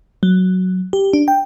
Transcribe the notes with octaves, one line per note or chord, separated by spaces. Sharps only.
F#3
G4
D4
G5